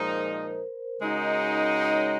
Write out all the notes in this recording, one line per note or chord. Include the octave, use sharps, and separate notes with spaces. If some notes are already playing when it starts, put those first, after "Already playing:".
Already playing: A#2 F3 G#3 D#4 A#4 C5
C#3 G#3 D#4 F#4
D#5
C#5